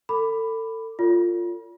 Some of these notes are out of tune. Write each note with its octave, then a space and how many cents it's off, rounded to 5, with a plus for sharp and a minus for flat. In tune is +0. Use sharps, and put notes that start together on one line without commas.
A4 +35 B5 +10 D6 +0
F4 +0 A4 +45 C#5 +45